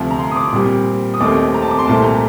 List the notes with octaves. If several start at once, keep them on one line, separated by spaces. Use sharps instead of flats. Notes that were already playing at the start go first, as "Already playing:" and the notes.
Already playing: D2 C3 F3
A#5
C6
D#6
D6
A#2 G3 C4
D#6
D#2 D#3 A3 C4 D6
A#5
A5
D6
C6
C2 A#2 A3 C4 A5
A#5